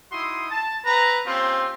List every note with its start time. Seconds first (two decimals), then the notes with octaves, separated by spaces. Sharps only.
0.12 D#4 E4 F#4 C6 D#6
0.51 A5
0.85 C4 B4 A#5
1.27 A#3 C4 C#4 F4 G4